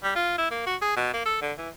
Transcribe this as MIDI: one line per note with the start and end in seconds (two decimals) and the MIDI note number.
0.03 0.14 55
0.15 0.35 65
0.38 0.50 64
0.51 0.65 58
0.66 0.76 66
0.81 0.94 68
0.96 1.11 47
1.13 1.25 58
1.25 1.37 69
1.41 1.52 50
1.58 1.69 52